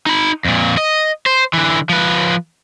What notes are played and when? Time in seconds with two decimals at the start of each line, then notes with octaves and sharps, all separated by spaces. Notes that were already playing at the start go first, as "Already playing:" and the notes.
0.06 D#4 B5
0.45 F2 A#2
0.77 D#5
1.26 C5
1.53 D3 E3
1.89 F3 B4